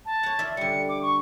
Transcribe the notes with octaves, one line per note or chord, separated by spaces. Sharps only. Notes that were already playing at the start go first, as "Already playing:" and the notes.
A5
C#5 F#5
F4 D5 E5
D3 G3 C#7
D6
C#6